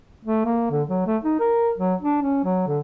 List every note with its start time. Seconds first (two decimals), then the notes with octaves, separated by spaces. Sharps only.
0.25 A3
0.45 A#3
0.71 D3
0.88 F#3
1.06 A3
1.23 D#4
1.39 A#4
1.78 F#3
2.01 D4
2.22 C#4
2.44 F#3
2.67 D3